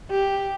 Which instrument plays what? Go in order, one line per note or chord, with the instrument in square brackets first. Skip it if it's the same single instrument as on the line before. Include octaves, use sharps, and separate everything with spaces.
[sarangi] G4